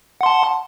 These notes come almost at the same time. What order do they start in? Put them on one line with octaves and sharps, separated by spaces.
F#5 C6 A5